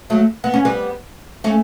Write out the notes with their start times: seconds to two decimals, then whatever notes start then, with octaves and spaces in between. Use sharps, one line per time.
0.10 F#3 A3
0.44 B3
0.54 C#4
0.65 G3 B3
1.44 A3 C#4